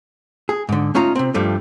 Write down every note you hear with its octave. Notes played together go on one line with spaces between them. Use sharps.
G#4
G#2 D3
A3 C#4 D#4 F4 A#5
C3 C4
G2 F3 G3 A3